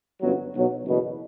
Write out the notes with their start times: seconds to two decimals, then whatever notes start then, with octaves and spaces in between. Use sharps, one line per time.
0.21 G1 F#2 F#3 B3
0.54 B1 B2 F#3
0.85 F#1 E2 B2